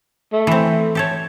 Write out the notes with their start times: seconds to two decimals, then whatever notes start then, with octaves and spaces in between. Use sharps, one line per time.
0.33 A3
0.47 E3 C4
0.95 G4 A4 C#5